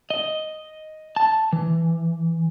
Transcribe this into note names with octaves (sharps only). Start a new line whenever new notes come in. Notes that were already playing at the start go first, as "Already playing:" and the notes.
D#5
A5
E3